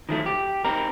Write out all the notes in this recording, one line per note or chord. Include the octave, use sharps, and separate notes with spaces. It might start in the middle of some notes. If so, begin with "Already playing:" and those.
D#3 F3 A3
G4
C4 D#4 A#4